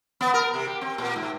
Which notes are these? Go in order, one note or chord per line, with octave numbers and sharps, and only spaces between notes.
B3
A#4
C3
G4
C4
A#2
G#2